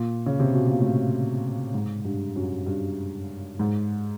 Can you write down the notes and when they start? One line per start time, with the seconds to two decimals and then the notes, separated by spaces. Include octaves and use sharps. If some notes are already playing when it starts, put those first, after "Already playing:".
Already playing: A#2
0.26 C#3
0.40 C3
0.53 B2
0.66 A#2
0.80 A2
1.74 G#2
2.05 G2
2.36 F#2
2.66 G2
3.59 G#2